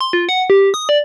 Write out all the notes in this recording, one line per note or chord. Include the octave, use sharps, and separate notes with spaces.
C6
F4
F#5
G4
D#6
D5